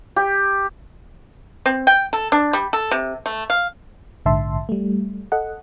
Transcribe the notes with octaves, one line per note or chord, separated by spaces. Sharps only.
G4
C4
G5
A4
D4
G3
A4
C3
A3
F5
A#1 G#2 D3 E5 A5 C6
G3 A3
A4 D#5 F#5